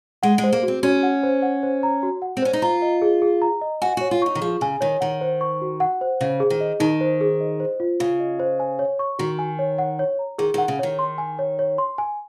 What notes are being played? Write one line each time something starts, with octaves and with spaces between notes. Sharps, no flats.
G#3 F#5
G#3
C5
A#3
F#4
C4
C#4 F#4
F#5
C5
F#5
C5
A#5
F#4
F#5
C4
C#4 C5
D#4
F4 A#5
D#5
G#4
G#4
A#5
D#5
F#4 G#5
F#4 C#5
F4
D#4 C#6
D#3
F3 G#4
C#3 G#5
D#3 C#5
D#3 F#5
C5
C#6
F#4
F#5
C5
C#3 C5
G#4
D#3
D#5
D#3 D#4
C5
G#4
D#5
C5
F4
C#3 F4
D#5
C5
G#5
C#5
C#6
D#3 F#4
G#5
C#5
F#5
C#5
A#5
D#3 G#4
D#3 F#5
C#3
D#3 C#5
C6
G#5
C#5
C#5
C6
G#5